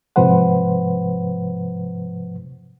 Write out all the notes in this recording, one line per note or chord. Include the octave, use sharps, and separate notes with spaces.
G#2 C3 F3 B4 C5 F#5